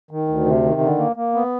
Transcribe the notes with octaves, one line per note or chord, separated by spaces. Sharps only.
D#3
D2
C3
D#3
D3
A#3
A#3
B3